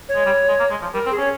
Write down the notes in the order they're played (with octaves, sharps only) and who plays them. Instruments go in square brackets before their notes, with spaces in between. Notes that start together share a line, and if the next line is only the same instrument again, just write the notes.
[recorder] C#5
[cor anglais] G#3
G3
G#3
A#3
G#3
F3
[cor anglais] G3 [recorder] A#4
[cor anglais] C4
[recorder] G#4
[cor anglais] C#4 [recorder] C#5